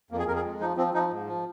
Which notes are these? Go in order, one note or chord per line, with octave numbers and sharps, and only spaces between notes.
F2 A#3
G#4
F2 A#4
G#4
G#3
F3 D#4
F3 C4
F3 D#4
G#2
F3